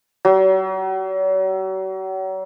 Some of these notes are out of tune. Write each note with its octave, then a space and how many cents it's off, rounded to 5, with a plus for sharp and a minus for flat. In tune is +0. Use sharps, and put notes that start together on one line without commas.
F#3 +40